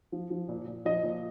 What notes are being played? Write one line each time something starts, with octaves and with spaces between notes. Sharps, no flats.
F3
F3
A#2
A#2
F3 D#5
A#2